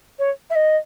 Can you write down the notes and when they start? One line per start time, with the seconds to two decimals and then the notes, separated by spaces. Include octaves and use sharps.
0.19 C#5
0.50 E5
0.55 D#5